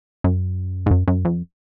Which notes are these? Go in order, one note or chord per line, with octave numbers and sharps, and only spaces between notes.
F#2
G#2
F#2
F#2
F2